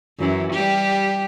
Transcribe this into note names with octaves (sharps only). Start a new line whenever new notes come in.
F#2 E3
G3 G4